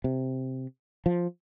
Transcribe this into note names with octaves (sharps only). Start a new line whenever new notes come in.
C3
F3